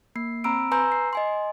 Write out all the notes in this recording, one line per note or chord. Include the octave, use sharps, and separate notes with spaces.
A#3 C7
C4 A#5 B5 E6 D7
B4 G#5 A#5 C6 E6 G6
C7
D#5 G#5 C6